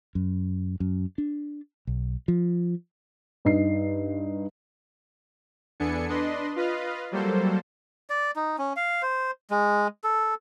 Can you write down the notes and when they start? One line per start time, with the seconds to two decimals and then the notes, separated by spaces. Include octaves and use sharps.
0.15 F#2
0.80 F#2
1.18 D4
1.87 B1
2.28 F3
3.45 G2 D#4 C7
5.80 E2 B3 D4 A4 G#5 C#7
6.09 D4 B4 D#5 C6
6.56 F4 B4 D#5 F5
7.11 F#3 G3 A#3 A4 C5
8.10 D5
8.36 D#4
8.58 C#4
8.76 F5
9.02 C5
9.50 G#3
10.04 A4